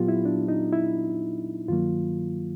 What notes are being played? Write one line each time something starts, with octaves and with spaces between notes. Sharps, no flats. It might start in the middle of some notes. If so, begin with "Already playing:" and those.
Already playing: A#2 F#3 B3 F4 G4
E4
D4
D#4
E4
G2 D#3 F#3 A#3 F4